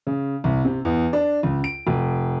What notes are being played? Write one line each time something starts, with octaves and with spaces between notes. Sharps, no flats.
C#3
C2
C3
E2
D4
C#2
D7
F1